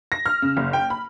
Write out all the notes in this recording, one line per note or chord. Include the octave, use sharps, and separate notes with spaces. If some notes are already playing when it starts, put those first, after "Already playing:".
A#6
F6
C#3
F#1
G5
B5